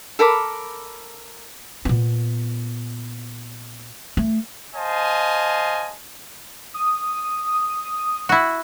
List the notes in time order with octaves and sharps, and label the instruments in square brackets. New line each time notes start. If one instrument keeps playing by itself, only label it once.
[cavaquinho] A4 A#4 B5 D6
[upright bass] A#2 B3
A3
[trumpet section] C5 D#5 F5 G#5 A5
[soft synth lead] D#6
[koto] E4 F#4